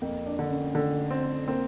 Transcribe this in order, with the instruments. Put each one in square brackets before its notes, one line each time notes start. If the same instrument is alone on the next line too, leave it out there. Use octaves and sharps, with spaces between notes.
[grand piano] F2 [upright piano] A#3
[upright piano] D4
[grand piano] D3
[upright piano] C#4
[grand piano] D3 [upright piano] A3
[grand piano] C4
[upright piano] A#3 [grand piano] C4